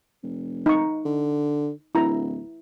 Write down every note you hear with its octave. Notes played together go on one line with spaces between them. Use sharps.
F1
D#4 C#6
D3
D1 E4 A#5